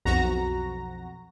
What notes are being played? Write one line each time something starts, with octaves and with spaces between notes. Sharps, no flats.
B1 F2 F#4 A#5 A#6